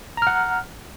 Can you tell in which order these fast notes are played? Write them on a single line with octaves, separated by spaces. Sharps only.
A#5 F6 F#5